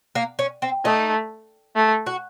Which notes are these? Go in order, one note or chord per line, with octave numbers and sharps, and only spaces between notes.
A#3
C#4
C4
A3 D#4
A3
F#4